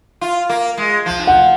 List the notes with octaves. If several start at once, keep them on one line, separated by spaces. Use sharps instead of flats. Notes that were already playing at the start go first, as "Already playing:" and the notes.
F4
A#3
G#3
F3
F#5